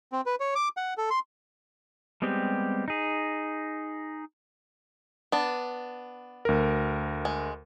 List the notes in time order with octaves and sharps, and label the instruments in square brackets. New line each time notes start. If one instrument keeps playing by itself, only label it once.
[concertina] C4
B4
C#5
D6
F#5
A4
C6
[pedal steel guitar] G3 G#3 B3 C4 G4
D#4 G#4
[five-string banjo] B3 D4
[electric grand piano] D2 A#4
[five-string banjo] G#3